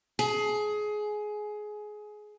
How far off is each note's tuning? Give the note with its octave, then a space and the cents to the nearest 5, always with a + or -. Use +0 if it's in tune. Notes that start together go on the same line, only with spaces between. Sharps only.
G#4 +20